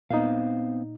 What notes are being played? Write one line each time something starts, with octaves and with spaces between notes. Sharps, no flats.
A#2 B3 C4 D#4 F5